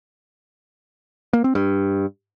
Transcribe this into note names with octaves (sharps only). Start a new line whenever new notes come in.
A#3
C4
G2